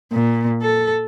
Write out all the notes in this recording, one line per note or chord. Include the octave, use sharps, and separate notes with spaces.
A#2
A4